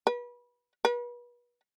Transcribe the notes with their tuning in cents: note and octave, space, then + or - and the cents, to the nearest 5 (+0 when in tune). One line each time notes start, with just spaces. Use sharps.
B4 -30
B4 -35